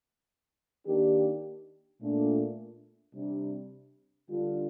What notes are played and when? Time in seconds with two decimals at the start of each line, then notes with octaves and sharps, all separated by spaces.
0.86 D#3 A#3 D4 G4
2.00 A#2 A3 D4
3.14 C3 G3 D4
4.28 D3 G3 D4 F4